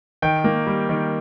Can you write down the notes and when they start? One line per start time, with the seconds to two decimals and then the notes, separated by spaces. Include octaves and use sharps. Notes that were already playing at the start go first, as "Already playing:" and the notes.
0.22 D#3 G5
0.44 A#3
0.67 G3
0.89 D#3